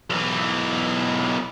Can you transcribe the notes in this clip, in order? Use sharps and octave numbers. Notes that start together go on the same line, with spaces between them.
B1 E3